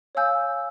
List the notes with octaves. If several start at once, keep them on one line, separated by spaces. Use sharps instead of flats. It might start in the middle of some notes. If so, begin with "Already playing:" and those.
C#5 F5 G#5 E6 G6